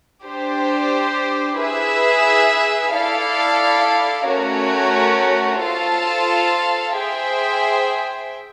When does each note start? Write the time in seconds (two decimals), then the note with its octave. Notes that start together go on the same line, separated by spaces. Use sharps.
0.25 D4 G4 C5
1.59 E4 G#4 B4 E5
2.93 E4 A4 D5 F5
4.29 A3 C#4 F#4 A#4 C#5
5.63 F4 A4 C5 F5 A5
6.97 G#4 C5 E5 G5